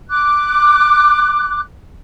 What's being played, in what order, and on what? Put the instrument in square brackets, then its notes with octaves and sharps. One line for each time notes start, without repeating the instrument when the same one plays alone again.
[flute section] D6 F#6